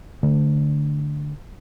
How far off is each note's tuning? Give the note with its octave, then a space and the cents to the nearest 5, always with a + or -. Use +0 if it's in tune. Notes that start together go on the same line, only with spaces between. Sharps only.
D3 +0 A3 +0